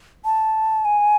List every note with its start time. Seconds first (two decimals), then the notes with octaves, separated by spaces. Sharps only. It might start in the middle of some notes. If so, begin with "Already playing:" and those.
0.25 A5
0.85 G#5